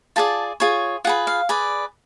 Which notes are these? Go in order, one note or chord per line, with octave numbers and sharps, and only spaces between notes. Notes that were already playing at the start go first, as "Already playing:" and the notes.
F4 G#4 D5 A5
F4 G#4 C#5
F4 G#4 B4 F#5
F5
G#4 B4 D5